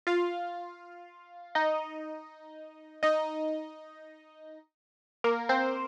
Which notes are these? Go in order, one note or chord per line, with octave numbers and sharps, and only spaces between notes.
F4 F5
D#4 D#5
D#4 D#5
A#3 A#4
C4 C5